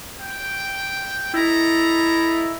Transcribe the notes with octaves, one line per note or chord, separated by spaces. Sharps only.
G5
E4 A4 D#5 A#5